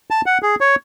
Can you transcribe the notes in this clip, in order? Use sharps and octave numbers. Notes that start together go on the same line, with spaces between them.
A5
F#5
G#4
C#5